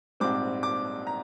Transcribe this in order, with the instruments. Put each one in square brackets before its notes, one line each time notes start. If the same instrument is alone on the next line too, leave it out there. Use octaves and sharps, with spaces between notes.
[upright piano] A#1 G#2 G3 C4 D6
D6
A#5